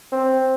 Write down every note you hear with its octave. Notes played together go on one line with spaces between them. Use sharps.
C4